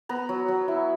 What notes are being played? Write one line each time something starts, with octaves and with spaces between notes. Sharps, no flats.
B3 A#5
F#3
F#3
E4